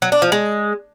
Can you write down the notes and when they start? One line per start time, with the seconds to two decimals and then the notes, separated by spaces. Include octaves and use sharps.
0.02 F#3
0.12 D4
0.22 F3
0.32 G#3